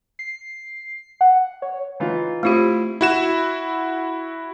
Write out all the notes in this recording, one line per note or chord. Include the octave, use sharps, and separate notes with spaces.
C7
F#5
C#5
E3 D#4 F4
A3 C4 E4 F4 G4
E4 F#4 E7